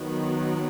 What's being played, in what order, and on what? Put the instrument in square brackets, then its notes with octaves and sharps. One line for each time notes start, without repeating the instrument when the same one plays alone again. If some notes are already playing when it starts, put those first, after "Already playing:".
Already playing: [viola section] D#3 F#3 B3